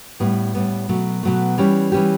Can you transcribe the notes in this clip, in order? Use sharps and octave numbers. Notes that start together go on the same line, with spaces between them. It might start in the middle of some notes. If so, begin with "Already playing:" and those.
A2 G3 B3
A2 G3 B3
B2 F#3 A3
B2 F#3 A3
E3 G3 C#4 G4
E3 G3 C#4 G4